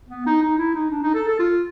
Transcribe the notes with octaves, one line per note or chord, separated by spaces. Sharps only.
B3
D#4
D#4
E4
D#4
D4
D#4
A4
A4
F4